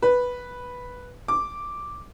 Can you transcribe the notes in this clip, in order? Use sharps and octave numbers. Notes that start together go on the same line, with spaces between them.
B4
D6